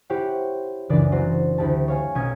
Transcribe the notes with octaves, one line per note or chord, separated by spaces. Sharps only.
E4 G4 C5 C#5 F#5
F#1 C#2 E3 D4 D5 A6
F#3 C4 F#4 C5
D2 E4 G4 A5
C#5 F5 G#5
B1 C#4 D#5 G#6 C#7